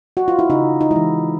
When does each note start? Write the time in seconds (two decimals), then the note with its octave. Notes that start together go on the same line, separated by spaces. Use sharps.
0.17 F#4
0.28 F4
0.39 E4
0.50 C#3 D#4
0.81 D#4
0.91 E3 G#3 E4